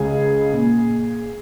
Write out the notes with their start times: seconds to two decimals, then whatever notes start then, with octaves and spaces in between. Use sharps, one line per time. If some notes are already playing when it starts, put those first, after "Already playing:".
Already playing: C#2 C#3 G#4
0.52 A#2